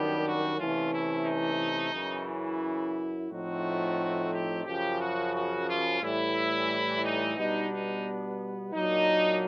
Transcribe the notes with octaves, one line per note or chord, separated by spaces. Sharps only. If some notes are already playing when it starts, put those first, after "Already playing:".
Already playing: F#2 D#3 G3 B3 D4 G4
F#4
C3 E3 A3 C#4 F4
E4
D#4
F#2 C#3 E3
E4
A2 F3 A3 C4 D#4 F#4
G4
F#2 C#3 F3 G4
F#4
F#4
F4
A2 E3 G3 E4
D#4
B2 G3 B3 D4 D#4
D#4
A#2 F#3 A#3 D4 D#4